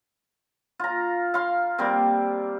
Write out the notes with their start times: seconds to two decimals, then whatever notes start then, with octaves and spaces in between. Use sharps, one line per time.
0.79 F4 A#5
1.34 F5 C6
1.78 G3 A#3 C4